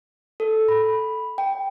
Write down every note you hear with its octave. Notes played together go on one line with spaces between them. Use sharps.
A4
B5
G5